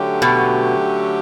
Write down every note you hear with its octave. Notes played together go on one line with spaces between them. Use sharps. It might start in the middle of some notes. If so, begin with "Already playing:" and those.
Already playing: D3 F#3 A3 C#4 G4
B2